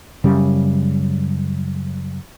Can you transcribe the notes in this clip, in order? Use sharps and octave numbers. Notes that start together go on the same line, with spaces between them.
F#2 C#3 G3